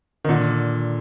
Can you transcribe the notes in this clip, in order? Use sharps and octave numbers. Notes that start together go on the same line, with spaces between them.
D#3
A#2 D3